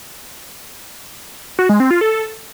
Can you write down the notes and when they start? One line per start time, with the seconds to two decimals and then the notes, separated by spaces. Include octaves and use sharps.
1.59 F#4
1.69 G#3
1.80 C4
1.91 F4
2.01 A4